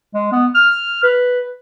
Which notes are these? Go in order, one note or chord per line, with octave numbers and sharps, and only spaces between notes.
G#3
B3
F6
B4